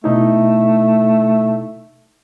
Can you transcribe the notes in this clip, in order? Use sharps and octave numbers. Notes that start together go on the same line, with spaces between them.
B2 A3 D#4 E4